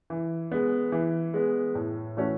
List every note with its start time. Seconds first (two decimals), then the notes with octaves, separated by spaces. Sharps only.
0.10 E3
0.51 G#3 B3
0.92 E3
1.34 G#3 B3
1.75 A2
2.17 E3 A3 C#4 F#4